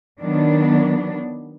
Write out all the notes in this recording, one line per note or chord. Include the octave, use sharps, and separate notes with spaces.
D#3 F#3 B3 D4